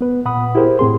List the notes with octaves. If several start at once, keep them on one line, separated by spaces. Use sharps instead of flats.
B3 B4
A#2 F#5 B5 D#6
E4 G4 G#4 A#4 C5
A2 C4 G#4 C6